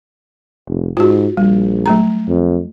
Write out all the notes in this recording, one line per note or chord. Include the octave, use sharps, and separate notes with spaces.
F1
G#2 F4 F#4
A#1 G3
F#3 A3 A#5
F2